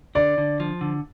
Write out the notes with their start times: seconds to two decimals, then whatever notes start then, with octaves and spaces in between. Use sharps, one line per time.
0.15 D3 D5
0.38 D3
0.60 F3
0.81 D3